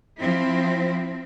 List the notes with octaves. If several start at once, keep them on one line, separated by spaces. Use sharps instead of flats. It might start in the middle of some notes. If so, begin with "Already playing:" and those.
F3 C4 E4